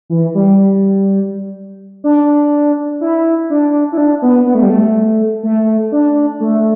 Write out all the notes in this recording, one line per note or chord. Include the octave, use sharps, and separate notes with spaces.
E3
G3
D4
E4
D4
E4
D4
B3
B3
A3
G3
A3
A3
D4
A3